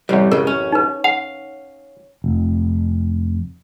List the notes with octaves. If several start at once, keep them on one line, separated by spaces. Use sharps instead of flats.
A1 F#2 C3 G3
C#2 C#3 A#4
C#4
D#4 B4
F5 F#5
F1